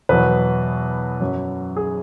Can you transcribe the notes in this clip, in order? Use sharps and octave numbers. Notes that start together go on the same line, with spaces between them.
E2 B2 F#3 B4
F#2 F#3
G#4